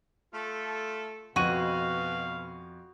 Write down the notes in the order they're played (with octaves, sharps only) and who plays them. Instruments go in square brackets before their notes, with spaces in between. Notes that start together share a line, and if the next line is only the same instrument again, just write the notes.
[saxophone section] A3 F4 A4
[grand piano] F2 D#7 [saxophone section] B2 [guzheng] F#4 [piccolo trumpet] F5